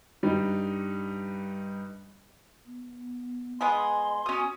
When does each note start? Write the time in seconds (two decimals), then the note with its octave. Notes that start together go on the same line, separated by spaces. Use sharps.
0.23 G2 G3 D#4
2.67 B3
3.61 G#3 B3 G#4 D#5 C6
4.26 C#4 F#4 D#6